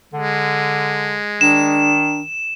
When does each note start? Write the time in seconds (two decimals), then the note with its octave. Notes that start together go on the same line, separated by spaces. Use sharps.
0.14 D3 G#3
1.41 D#3 D4 E7